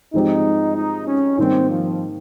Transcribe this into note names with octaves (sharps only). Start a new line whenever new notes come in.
G#2 F3 G#3 C4 D#4 G4
D#4
C#4
G#2 D#3 G3 A#3 C4 D#4
F3